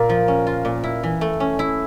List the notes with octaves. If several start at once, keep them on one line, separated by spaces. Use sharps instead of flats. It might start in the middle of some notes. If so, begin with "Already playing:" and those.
Already playing: A#2 F4 A#4
F3
C#4
F4
A#2
E4
E3
A3
C#4
E4